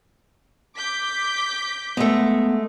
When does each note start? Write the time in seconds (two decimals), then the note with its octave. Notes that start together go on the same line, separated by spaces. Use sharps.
0.78 D6 G6 B6
1.97 G#3 A3 B3